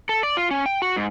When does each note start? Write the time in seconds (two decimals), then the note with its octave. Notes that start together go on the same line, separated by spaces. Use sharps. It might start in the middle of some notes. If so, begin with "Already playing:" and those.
0.09 A4
0.23 D5
0.37 F4
0.51 C#4
0.66 G5
0.82 F#4
0.96 G#2